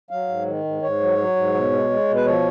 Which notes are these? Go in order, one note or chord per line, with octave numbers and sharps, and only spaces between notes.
F#3 F5
G#2
D#3
G#2
G#2 C#5
F#3
F#3
G#2
B2
G#3
G#3
B2
B4
F3 C#5